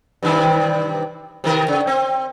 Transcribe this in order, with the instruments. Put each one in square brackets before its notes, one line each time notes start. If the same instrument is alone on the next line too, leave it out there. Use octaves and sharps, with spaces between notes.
[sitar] G2 C3 D#3
C3 D#3 A#4
C#3
C4